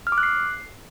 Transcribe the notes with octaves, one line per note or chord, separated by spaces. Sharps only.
F6
D6
F#6
C7